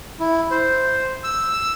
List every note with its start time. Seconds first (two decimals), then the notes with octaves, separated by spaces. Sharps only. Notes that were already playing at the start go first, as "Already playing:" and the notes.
0.20 E4
0.51 C5
1.24 E6